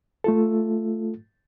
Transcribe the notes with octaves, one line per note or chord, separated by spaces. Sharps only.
A3 F4 A4